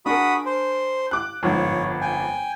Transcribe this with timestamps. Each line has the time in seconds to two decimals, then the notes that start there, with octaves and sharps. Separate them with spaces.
0.06 D4 F#4 G#4 A#4 B5 D#6
0.46 C5
1.11 D6 F#6
1.43 G1 F2 G#2 C#5
2.01 G5 G#5